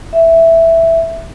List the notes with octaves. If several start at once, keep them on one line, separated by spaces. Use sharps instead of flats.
E5